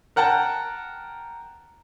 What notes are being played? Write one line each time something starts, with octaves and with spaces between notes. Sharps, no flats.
A#4 F#5 G5 A5